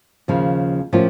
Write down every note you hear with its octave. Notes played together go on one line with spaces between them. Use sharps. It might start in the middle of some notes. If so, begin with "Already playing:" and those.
D#2 C#3 F3
A2 F3 A#3 C#4 F4